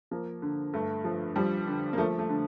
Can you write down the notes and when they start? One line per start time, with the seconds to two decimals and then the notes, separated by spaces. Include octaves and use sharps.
0.11 F3 A#3
0.42 D3
0.73 G2 A3
1.04 F3
1.36 F3 G3
1.67 D3
1.93 A#3
1.98 F3 A3
2.19 A3
2.29 D3